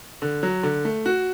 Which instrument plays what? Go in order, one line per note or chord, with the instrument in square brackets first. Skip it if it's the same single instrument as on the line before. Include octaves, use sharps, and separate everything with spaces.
[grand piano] D3
F#3
D3
A3
F#4